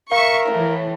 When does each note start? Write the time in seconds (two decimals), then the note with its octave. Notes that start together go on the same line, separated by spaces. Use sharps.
0.12 A#4 E5 F5 C#6
0.48 A2 E3